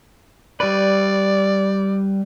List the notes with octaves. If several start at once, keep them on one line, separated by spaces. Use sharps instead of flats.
G3 B4 D5